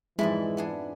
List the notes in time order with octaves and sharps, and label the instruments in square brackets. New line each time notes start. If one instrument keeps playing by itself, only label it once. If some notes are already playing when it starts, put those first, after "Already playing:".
[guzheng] F2 G#2 D5 [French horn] E3 [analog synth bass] G#3 [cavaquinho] E4
[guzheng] B3 D4 G#4